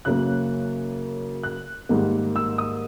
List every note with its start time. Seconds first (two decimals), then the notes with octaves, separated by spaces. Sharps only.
0.05 F#2 C#3 F#3 A#3 F#6
1.43 F#6
1.89 G#2 D#3 G3 A#3
2.36 E6
2.58 D#6